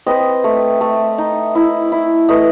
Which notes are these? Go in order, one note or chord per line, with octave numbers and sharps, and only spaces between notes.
C4 B4 D#5
A3
A3
D#4
E4
E4
A3 B4 D#5